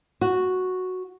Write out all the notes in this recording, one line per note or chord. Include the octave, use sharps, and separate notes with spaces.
F#4